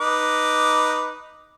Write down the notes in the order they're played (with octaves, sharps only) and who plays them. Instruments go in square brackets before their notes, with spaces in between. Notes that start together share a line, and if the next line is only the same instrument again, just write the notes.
[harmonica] D#4 B4 D6